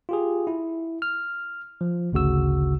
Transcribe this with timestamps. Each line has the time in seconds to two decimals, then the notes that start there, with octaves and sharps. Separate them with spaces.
0.09 F4 G4 G#4
0.47 E4
1.02 F6
1.81 F3
2.12 G#1 D2 C#3 F#4 E6